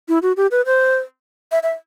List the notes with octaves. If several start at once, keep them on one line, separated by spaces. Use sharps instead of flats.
E4
F#4
G4
B4
C5
E5
E5